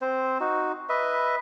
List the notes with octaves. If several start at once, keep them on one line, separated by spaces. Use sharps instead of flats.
C4 C5
D#4 F#4
B4 D#5 E5